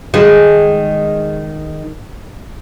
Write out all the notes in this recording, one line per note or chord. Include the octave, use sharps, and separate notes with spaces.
D#3 G#3